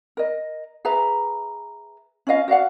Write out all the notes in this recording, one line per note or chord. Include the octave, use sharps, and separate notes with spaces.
A#4 D#5
G#4 B4 E5 A#5
C#4 F4 D#5 F5
F#4 D5 F5 F#5